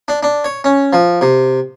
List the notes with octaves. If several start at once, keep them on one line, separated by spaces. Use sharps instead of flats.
D4
D4
C#5
C#4
F3
C3